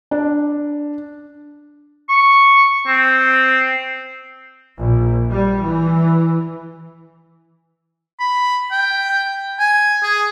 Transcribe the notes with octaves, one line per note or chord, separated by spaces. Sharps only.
D4
C#6
C4
A#1
G3
E3
B5
G5
G#5
G#4